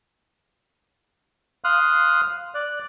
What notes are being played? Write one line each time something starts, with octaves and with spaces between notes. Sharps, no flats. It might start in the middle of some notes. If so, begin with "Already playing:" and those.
F5 C6 D#6 F6 F#6
D5 F#6